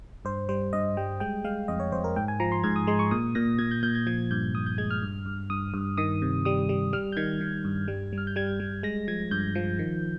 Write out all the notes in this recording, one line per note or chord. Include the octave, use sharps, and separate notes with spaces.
G2 C5
G3 C5
G2 D#5
G3 G5
G#3 G5
G#3 F5
F2 D#5
C#5
F2 C5
A#4
G#2 G5
G#5
F3 A#5
C6
G#2 G#6
D#6
G#3 C6
C#6
A#2 D#6
A#2 A#6
A#2 G#6
G6
A#2 G6
G#6
F3 G#6
G2 G6
G2 D#6
G6
G#3 G#6
F6
G2
G2
G2 D#6
G2
D#3 D#6
C3
G3 D#6
G3
G3 F6
G6
D#3 G#6
D#3
G2
G3
G3
F6
G6
G3 G#6
G3
G#3 A#6
F3 G#6
G2 G6
F3
D#3